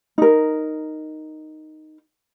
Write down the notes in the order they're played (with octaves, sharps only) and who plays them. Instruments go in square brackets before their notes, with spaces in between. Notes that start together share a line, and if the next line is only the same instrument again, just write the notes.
[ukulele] D#4 A#4